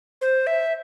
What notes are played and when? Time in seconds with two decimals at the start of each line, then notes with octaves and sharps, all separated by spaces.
0.21 C5
0.47 E5